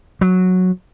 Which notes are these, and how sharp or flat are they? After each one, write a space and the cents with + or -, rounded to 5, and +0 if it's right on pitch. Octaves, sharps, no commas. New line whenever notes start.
F#3 -10